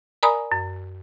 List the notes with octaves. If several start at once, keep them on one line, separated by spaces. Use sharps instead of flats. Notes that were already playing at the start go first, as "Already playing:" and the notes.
A#4 D5 G#5 A#5 B5 D#6
F#2